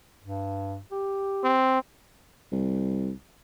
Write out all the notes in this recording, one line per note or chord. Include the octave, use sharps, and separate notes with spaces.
G2
G4
C4
C2